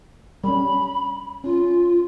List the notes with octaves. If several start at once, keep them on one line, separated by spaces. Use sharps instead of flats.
G3 C#4 B5
C#4 F4